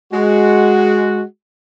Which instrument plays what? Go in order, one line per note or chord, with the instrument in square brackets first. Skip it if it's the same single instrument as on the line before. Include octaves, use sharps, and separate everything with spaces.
[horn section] G#3 F#4